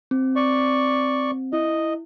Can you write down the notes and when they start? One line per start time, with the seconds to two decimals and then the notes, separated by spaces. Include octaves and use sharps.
0.11 C4
0.36 D5 C#6
1.53 E4 D#5